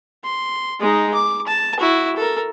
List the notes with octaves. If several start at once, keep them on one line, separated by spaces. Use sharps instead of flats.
C6
G#3 D#4
D6
A5
E4 F#4
A4 A#4